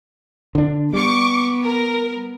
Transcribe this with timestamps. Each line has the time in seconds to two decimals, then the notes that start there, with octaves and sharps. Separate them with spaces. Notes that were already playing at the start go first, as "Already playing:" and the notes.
0.55 D3 D4
0.93 G3 B3 C#6 D6
1.63 A#4